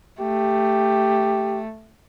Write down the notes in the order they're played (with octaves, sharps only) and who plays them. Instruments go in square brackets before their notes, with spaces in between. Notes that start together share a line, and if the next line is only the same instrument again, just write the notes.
[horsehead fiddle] A3 [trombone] G4